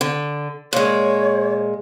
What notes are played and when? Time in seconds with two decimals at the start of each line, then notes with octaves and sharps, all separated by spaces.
0.01 D3
0.73 A#2 G#3 C#5